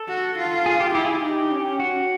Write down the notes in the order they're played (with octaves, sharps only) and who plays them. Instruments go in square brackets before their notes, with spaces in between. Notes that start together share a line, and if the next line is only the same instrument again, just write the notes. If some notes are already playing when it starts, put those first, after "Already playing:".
Already playing: [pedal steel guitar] A4
[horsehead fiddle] F#4
F4
[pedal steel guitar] G#4
G4
[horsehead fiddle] E4 [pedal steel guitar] G4
[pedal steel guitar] G#4
G4
[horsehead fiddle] D#4
C#4
[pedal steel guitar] F#4